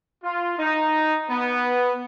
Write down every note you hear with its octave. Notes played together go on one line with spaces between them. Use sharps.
F4
D#4
B3